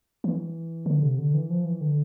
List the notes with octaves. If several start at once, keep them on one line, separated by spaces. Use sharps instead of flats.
E3
D3
C3
D3
E3
F3
E3
D3